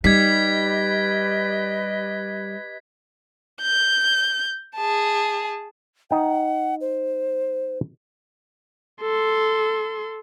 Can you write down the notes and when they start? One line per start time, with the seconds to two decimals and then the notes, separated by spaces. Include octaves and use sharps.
0.04 G3 D#4 G4 B4 D#5 G#6 B6
3.62 G6
4.76 G#4 A5
6.11 D#4 F#5 G5
6.81 C5
9.01 A4 C6